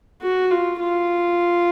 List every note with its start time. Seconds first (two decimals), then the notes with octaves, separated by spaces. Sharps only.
0.22 F#4
0.50 F4
0.80 F4